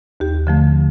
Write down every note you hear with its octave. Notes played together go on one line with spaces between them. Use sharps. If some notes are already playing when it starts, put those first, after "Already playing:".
D#2 G4
D3 F3 A3